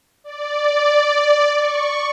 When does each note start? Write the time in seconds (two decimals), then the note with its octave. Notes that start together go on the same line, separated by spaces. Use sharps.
0.24 D5
1.57 C#6